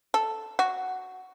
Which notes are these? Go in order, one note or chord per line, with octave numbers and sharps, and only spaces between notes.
A4
F#4